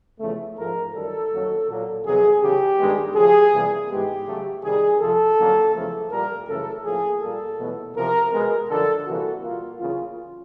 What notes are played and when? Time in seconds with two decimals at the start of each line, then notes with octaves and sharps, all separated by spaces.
0.20 E2 C#3 F3 A3
0.57 G#2 F3 G#3 A#4
0.94 F#2 D#3 G3 A4
1.31 F#2 D#3 F#3 A#3
1.69 A#2 F#3 A#3
2.05 F2 C3 D#3 F#3 B3 G#4
2.42 E2 C#3 F#3 G4
2.79 G2 D#3 G#3 B3
3.15 C#3 F3 A3 G#4
3.52 E2 C3 E3 G3 A#3
3.89 G#2 E3 G#3 B3 G4
4.27 C#3 F#3 A3
4.63 C3 D#3 G3 G#4
5.00 F2 C3 F3 A4
5.38 F#2 D3 F#3 A#3
5.74 E2 C#3 F3 A3
6.11 A#2 G3 A#3 A#4
6.47 F#2 C#3 E3 A3 A4
6.84 A2 F3 A#3 G#4
7.21 A#2 G3 A#3 A4
7.58 E2 B2 F#3 A3
7.95 E2 C3 F3 A#4
8.32 B2 G#3 B3 A#4
8.70 F#2 D3 F3 A4
9.06 C3 E3 G3 A#3 F#4
9.42 A#2 G3 A#3 F4
9.79 E2 C#3 F#3 A#3 F4